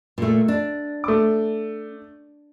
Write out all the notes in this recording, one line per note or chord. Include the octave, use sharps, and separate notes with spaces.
A#2 A3
D4
A3 D6